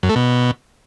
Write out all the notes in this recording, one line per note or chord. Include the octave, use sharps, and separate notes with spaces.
F#2
A3
B2